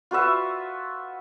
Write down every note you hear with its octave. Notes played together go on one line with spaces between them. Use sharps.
F4 F#4 B4 E5